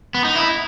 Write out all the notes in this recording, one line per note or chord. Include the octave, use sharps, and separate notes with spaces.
B3
D#4
E4